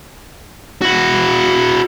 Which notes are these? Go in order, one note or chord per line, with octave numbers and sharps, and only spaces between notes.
E4 F#4